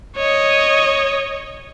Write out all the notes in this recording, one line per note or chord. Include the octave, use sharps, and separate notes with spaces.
C#5 D#5